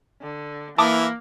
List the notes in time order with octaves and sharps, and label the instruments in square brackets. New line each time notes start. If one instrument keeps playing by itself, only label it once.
[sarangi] D3
[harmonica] E3 E4 [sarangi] A#3 [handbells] A5 D6 D#6